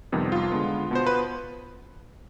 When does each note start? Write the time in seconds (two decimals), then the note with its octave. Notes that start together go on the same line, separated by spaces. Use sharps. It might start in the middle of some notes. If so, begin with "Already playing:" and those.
0.12 F2 C3 D#3 G3 B3
0.32 F4
0.52 D3 G#3 B3
0.91 B2 B3 C5
1.07 B4